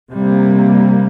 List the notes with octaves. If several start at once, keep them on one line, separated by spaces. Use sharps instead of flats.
C3 G3 A#3